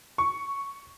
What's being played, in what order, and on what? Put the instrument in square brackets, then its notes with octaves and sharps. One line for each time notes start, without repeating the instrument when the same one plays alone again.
[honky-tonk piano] C#6